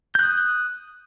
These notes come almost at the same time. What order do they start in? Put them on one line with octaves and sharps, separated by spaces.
G6 F#6 D#6